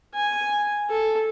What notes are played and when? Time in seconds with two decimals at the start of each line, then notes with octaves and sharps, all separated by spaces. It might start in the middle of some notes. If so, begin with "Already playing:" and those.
0.15 G#5
0.90 A4